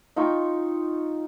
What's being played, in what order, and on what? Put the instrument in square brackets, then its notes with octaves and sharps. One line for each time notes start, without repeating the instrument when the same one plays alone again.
[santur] D#4 F4 G5 C#6